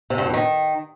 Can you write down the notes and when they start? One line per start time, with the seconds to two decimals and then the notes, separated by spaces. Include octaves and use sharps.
0.10 C3
0.18 G2
0.26 F2
0.34 D#3